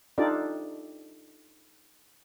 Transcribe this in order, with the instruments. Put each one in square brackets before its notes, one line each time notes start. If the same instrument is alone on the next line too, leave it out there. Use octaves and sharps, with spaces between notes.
[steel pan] D4 D#4 F4 G4 A4 D5